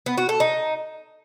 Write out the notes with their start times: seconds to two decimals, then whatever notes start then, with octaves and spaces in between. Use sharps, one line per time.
0.06 B3
0.18 F#4
0.29 A4
0.40 D#4